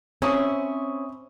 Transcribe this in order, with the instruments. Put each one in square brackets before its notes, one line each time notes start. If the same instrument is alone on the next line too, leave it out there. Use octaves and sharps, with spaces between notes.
[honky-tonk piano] C4 [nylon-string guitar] C#4 [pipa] E4 [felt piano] C#6 D#6